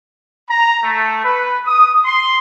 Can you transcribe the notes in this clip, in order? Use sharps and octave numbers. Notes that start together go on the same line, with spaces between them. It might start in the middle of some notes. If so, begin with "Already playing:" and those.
A#5
A3
B4
D#6
C6